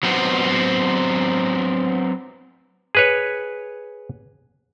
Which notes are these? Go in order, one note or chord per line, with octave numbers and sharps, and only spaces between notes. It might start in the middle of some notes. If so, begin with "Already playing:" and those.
F#3 B3 C4
G#4 B4 C#5